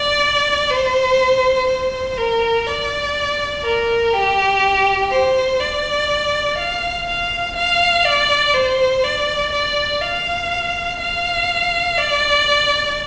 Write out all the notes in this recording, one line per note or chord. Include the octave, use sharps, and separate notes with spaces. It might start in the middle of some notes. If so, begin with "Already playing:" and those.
Already playing: D5
C5
C5
A#4
D5
A#4
G4
C5
D5
F5
F5
F5
D5
C5
D5
D5
F5
F5
D5